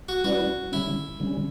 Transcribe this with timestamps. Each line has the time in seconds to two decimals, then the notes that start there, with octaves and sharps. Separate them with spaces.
0.09 F#4
0.24 G3 C#4 E4 F#4 B4 D5
0.72 D3 G3 C#4 E4
1.20 D3 G3 C#4